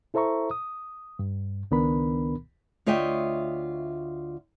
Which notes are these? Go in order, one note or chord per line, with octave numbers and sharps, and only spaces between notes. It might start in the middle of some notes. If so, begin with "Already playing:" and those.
E4 A4 C5 E5 A#5 C#6
D#6
G2
C#2 D#3 B3 D4 A#4 B5
D2 F4 C#5 D#5 E5 G5